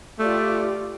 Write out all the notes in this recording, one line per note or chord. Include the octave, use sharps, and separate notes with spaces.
A3 F4 G4 D5